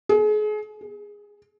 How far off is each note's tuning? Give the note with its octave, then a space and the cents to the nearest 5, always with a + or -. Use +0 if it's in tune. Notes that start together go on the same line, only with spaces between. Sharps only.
G#4 +35
G#4 -10